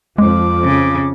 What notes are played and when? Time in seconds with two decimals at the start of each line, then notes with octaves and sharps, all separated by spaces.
0.18 F2 F3 G#3 D6
0.64 C#3